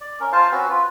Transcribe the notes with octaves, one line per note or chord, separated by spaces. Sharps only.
D5
C#4 A#4
F4 C5 F5 A5
C4 C#4 F#4 B4
F4 B4